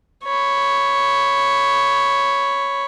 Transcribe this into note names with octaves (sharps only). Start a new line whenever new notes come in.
C#5 B5